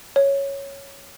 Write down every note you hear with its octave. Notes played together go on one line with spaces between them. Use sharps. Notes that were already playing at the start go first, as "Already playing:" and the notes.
C#5